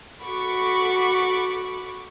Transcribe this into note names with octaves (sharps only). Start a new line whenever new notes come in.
F#4 A4 B5 C#6 D6